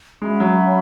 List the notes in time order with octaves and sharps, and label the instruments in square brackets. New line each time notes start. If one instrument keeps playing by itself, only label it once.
[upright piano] G#3 [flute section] C#4 F#4 E5 B5
[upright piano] F#3